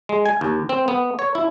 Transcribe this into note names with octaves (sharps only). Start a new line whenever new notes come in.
G#3
G#5
D#2
C4
B3
C#5
E4